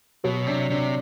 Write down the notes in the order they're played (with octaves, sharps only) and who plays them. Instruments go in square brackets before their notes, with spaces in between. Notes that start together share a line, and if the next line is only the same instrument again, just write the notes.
[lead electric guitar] B2 [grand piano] F#3
[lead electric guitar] C3 [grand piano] D4
[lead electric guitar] C3 [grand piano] D4